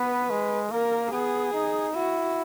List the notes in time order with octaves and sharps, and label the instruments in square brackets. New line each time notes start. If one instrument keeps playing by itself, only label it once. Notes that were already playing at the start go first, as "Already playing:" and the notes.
Already playing: [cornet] B3 [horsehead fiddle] B4
[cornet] G#3
[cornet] A#3 [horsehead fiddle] A#4
[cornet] B3 [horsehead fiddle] G#4
[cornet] D#4
[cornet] E4 [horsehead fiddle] F#4